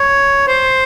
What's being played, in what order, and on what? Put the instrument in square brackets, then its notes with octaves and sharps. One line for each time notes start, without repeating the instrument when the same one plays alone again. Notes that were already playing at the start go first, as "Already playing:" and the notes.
Already playing: [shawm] C#5
C5